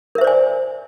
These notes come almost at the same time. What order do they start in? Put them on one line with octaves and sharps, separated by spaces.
A#4 E5 C5 D5 G#5